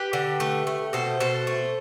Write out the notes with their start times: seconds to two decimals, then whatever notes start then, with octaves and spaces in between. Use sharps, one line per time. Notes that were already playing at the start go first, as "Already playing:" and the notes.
Already playing: G4 B4
0.13 D3
0.40 A3
0.67 A3
0.93 B2 A4 C5
1.20 B2 A4 C5
1.47 A3